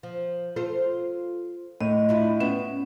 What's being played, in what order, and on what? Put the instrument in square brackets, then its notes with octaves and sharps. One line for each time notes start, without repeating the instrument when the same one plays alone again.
[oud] F3
F4 A4 C5
[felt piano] A2 [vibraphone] D#5
[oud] D4 E4 F4
[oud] B3 [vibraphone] C#4